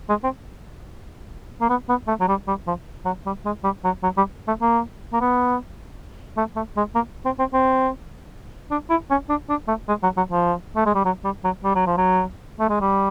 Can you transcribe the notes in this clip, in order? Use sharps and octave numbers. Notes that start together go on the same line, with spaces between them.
G#3
C4
A#3
B3
B3
A3
F#3
G3
G3
F3
F#3
G3
G#3
G3
F#3
F#3
G3
A3
A#3
A#3
B3
A3
A3
G#3
A#3
C4
C4
C4
D4
E4
C#4
D4
D4
A3
G#3
F#3
F#3
F3
A3
G#3
G3
F#3
G3
F#3
G3
F#3
F3
F#3
A3
G#3
G3